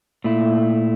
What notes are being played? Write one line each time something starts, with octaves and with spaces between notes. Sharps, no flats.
A#2 A3 E4